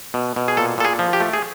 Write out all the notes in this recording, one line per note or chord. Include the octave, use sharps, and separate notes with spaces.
B2
B2
G#4
A#2 A4
A#2 A4
G#4
F3
G4
A3
G#4